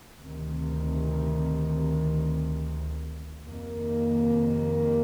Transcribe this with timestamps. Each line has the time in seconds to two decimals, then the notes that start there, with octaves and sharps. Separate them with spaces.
0.19 D2 C3 D#3
3.45 F2 C3 D#3 A#3